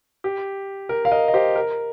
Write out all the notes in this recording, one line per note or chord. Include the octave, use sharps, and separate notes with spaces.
G4
A#4
F5
A#4 D#5
D#5
G4 C5
A#4